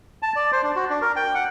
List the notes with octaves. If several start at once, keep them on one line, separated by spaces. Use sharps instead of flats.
A5
D5
C5
D4
F#4
D4
A#4
G5
F#5